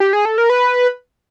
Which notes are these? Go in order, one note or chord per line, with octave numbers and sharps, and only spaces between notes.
G4
G#4
A4
A#4
B4